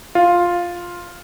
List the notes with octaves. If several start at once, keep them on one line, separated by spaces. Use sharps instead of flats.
F4